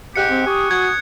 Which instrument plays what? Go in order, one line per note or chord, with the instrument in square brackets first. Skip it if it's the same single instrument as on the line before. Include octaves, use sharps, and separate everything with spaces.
[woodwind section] G#2 G4 [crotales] F#6 C#7
[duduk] C4
[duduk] G4 [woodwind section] G#5 C#6 D#6
[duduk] F#4 [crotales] G#6